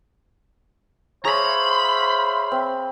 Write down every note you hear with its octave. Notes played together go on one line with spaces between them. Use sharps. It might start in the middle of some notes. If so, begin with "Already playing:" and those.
G#4 C5 C#5 E5 F5 A#5 B5
C4